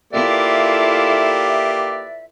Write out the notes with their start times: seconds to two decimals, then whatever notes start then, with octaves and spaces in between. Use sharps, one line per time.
0.13 A#3 E4 F4 G4 A4 B4 D5 E5